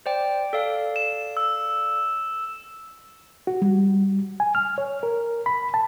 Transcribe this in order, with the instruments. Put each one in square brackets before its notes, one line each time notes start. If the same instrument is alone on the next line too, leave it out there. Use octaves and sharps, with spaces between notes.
[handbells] C5 D5 G5
A4 D5 F5
[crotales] E7
E6
[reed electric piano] F#4
G3
G#5
F6
C#5
A#4
B5
A5